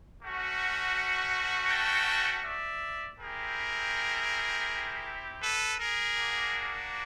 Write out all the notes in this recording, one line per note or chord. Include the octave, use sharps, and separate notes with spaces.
A3 C#4 F#4
G5 A5
D5 E5
C4 E4 G4 G#4 A#4
A4 B4
G#4 A#4
A#3 D4 F#4